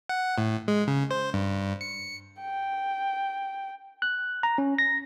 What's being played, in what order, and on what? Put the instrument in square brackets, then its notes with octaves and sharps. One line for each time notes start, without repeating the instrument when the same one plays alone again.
[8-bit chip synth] F#5
A2
G#3
C#3
C5
G2
C#7
[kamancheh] G5
[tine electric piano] F#6
A#5
C#4
A#6